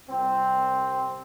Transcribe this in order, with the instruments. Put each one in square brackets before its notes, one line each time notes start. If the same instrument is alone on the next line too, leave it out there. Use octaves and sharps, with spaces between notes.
[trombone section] C2 C4